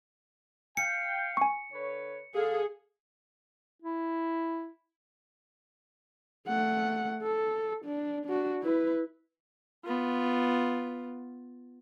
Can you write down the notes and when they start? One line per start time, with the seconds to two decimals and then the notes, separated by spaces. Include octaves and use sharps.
0.77 F5 G5 C#7
1.37 G#5 C#6
1.72 D3 B4 C#5
2.35 D3 G#4 A4 F5
3.82 E4
6.47 A3 F#5
7.23 A4
7.85 D4
8.26 D4 F#4
8.62 E4 B4
9.85 B3 F4